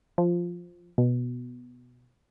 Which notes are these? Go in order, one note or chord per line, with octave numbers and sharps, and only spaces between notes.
F3
B2